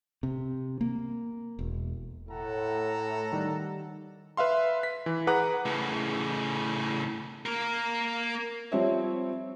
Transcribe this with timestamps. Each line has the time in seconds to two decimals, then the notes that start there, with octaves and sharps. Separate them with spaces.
0.23 C3
0.81 A#3
1.59 E1
2.29 A2 A4 F#5 A#5
3.32 D#3 G3
4.37 B4 E5 F5 C6
4.83 B6
5.06 E3
5.27 G#4 B4 F#5 A#5 D6 F#6
5.65 A2 C#3
7.46 A#3 A#4
8.72 F3 G3 C4 C5 C#5 E5